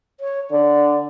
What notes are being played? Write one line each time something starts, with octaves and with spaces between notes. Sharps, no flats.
C#5
D3 D5